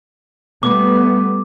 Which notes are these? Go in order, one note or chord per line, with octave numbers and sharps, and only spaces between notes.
G3 A3 B3 D6